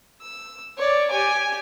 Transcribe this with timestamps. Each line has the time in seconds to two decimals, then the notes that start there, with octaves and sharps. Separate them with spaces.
0.21 E6
0.78 C#5 D5
1.10 G4 G#5